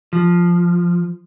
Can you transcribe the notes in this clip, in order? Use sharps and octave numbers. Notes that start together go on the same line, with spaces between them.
F3